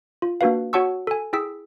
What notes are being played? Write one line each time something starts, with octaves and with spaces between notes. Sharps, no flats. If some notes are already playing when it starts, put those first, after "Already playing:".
F4
A#3 D4 F#4 B4 F5
F#4 C#5 F#5 A5 C#6 E6
A4 G#5
E4 G#4 G5 E6 B6